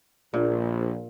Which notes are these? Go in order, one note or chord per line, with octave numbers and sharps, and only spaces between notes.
A#1 A#2